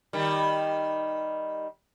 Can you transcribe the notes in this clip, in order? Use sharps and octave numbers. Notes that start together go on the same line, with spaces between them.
D#3 G3